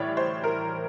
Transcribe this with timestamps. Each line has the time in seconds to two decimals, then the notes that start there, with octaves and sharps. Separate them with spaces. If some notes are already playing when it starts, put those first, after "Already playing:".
Already playing: A2 E3 G3 C#5 D5
0.17 C5
0.44 A#4